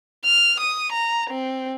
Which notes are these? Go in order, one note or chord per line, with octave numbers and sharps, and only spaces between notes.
F6
D#6
A#5
C4